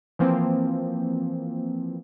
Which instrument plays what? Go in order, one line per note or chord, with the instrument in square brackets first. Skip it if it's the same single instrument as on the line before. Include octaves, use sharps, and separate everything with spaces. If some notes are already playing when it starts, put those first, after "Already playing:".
[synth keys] E3 F3 A#3 C4